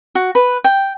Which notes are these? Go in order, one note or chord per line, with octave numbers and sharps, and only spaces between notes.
F#4
B4
G5